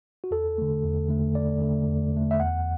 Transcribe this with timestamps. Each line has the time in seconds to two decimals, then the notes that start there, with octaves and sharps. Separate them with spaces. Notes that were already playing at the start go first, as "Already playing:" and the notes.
0.24 F#4
0.31 E2 A4
0.58 D3 A3
0.84 E2
1.09 D3 A3
1.35 E2 D5
1.61 D3 A3
1.87 E2
2.14 D3 A3
2.31 E5
2.40 E2 F#5